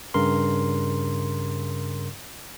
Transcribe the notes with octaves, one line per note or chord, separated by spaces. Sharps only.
G2 C#3 A#4 C6